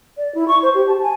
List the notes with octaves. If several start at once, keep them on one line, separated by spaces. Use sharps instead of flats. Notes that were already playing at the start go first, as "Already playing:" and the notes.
D5
E4
C#6
C5
G4
A5
G#5